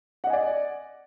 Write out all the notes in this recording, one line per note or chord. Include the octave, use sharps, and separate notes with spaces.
D5 D#5 F#5 G#5